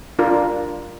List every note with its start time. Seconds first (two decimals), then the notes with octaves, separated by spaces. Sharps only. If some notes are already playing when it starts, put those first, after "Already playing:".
0.19 D4 F4 A#4